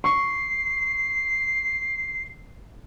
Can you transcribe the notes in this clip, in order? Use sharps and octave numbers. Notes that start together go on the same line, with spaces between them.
C#6 C7